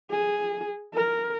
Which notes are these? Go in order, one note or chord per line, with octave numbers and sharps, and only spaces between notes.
G#4
A#4